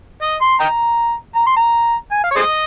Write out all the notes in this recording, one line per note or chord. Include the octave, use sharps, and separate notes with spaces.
D#5
C6
D#5 G5 A#5
A#5
C6
A#5
G#5
F5
C#5
G#4 C5 D#5